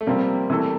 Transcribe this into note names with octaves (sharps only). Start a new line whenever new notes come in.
A3
C3 F3 G3 A#3 C4
C3 E3 A3 E4 A4